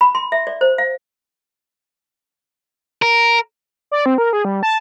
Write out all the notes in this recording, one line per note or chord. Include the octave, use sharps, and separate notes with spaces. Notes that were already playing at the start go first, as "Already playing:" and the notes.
B5
C6
E5
D5
C5
F5
A#4
D5
C4
A#4
G#4
G3
A5